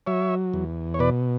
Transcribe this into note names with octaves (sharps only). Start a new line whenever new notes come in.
F#3 C#5 E5
E2
C#5
B2 B4 D5